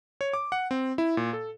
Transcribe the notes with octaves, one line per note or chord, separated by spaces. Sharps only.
C#5
D6
F#5
C4
E4
A#2
A4